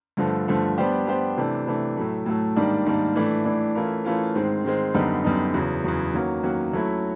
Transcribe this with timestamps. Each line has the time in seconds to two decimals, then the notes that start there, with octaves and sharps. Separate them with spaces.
0.17 G2 D3 F3 A3
0.48 G2 D3 F3 A3
0.78 G3 B3 D4 G4 C5
1.07 G3 B3 D4 G4 C5
1.37 C3 E3 A3 D4
1.66 C3 E3 A3 D4
1.97 A2 F#3 A3
2.26 A2 F#3 A3
2.56 G#2 D#3 G3 A#3 D4
2.86 G#2 D#3 G3 A#3 D4
3.16 A2 E3 A3 D4
3.45 A2 E3 A3 D4
3.75 E3 A3 C#4 F4 A#4
4.05 E3 A3 C#4 F4 A#4
4.35 G#2 D#3 G#3 C4
4.65 G#2 D#3 G#3 C4
4.94 F#2 D3 G3 B3 D#4
5.24 F#2 D3 G3 B3 D#4
5.54 E2 C#3 F#3
5.84 E2 C#3 F#3
6.13 D#3 F#3 A#3 C#4 F#4
6.43 D#3 F#3 A#3 C#4 F#4
6.73 F#3 A3 C#4 E4